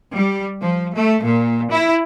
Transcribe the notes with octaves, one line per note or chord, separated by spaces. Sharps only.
G3
F3
A3
A#2
E4